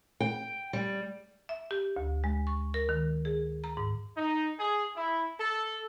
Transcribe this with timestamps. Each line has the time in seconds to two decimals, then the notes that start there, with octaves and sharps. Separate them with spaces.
0.20 G5
0.73 G3
1.49 E5
1.71 G4
1.96 D2
2.24 G#3
2.47 C#6
2.74 A#4
2.89 D#3
3.25 G#4
3.64 A#5
3.77 G#2
4.17 D#4
4.59 G#4
4.96 E4
5.40 A4